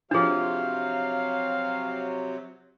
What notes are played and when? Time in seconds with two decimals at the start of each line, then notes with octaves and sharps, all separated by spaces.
0.11 C3 F3 F#3 D4 F4 G#4 F5